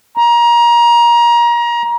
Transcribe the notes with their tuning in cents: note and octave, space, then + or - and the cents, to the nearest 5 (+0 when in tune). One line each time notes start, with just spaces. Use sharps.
A#5 +25